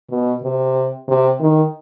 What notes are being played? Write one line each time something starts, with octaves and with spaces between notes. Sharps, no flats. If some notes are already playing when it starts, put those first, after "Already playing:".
B2
C3
C3
D#3